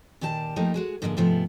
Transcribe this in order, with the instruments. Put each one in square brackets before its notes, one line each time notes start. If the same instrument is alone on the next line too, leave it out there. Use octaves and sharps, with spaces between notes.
[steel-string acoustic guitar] A#2 D#3 G4 A5
F3 A3 A#3 D#4 G4
G#3 F#4 G#4
G#2 D3 F3 G3 G#3 A#3
G#2 C3 F3 A3 B3